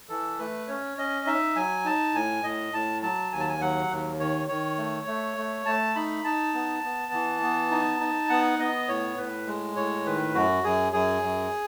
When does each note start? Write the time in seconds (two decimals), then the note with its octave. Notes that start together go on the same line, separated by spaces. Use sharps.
0.09 E3 A4
0.39 A3 B4
0.68 C#4 C#5
0.98 C#4 D#5
1.27 D#4 E5
1.56 F#3 G#5
1.85 D#4 A5
2.14 A2 G#5
2.43 A2 D#5
2.73 A2 A5
3.02 F#3 A5
3.32 D#2 G#5
3.40 A5
3.49 G#5
3.61 F#3 F#5
3.90 D#2
4.20 D#3 C#5
4.48 D#3 C#5
4.78 A3
5.07 A3
5.37 A3
5.66 A3 A5
5.95 D#4 B5
6.24 D#4 A5
6.54 B3
6.84 B3
7.13 E3
7.42 B3
7.71 D#4
8.00 D#4
8.29 B3 F#5
8.59 B3 D#5
8.88 A2 C#5
9.18 A2 B4
9.47 G#3
9.76 A2 C#5
10.06 D#3 B4
10.34 F#2 F#4
10.63 F#2 G#4
10.93 F#2 G#4
11.22 F#2